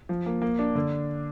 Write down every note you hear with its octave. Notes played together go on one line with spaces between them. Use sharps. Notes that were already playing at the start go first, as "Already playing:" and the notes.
F3
A#3
A#3
D4
D3